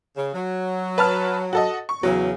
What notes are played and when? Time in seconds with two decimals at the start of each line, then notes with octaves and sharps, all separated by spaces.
0.16 C#3
0.34 F#3
0.98 B4 A5 F6
1.53 F#4 A4 D#5
1.89 C#6
2.03 E2 C#3 F#3